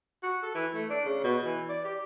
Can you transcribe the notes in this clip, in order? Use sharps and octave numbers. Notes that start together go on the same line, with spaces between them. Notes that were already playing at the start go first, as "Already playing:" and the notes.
F#4
A4
E3
A3
D4
C#3
B2
E3
D5
G4